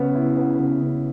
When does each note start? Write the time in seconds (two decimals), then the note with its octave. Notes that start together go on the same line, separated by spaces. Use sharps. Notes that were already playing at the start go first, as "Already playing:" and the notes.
Already playing: C#3 B3
0.15 E4
0.37 B3
0.59 C#3
0.81 C#3